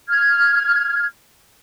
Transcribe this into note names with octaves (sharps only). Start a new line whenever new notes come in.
F6 G#6